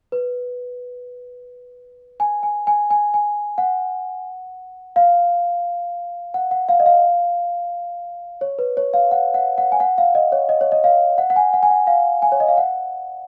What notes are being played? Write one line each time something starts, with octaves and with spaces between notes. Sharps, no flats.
B4
G#5
G#5
G#5
G#5
G#5
F#5
F5
F#5
F#5
F5
D#5
F5
C#5
B4
C#5
F5
F#5
F#5
F#5
G#5
F#5
F5
D#5
C#5
D#5
C#5
D#5
F5
F#5
F#5
G#5
F#5
G#5
F#5
F5
G#5
C#5
D#5
F5
F#5